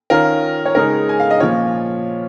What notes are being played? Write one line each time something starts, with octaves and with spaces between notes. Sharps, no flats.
D#3 C#4 F4 A#4
C#5
C#3 G#3 D#4 A#4
G#5
F5
D#5
A#2 F3 C#4 F4 C#5